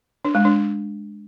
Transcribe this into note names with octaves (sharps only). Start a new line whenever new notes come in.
D4
G#3
D4